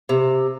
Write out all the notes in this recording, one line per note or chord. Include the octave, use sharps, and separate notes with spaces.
C3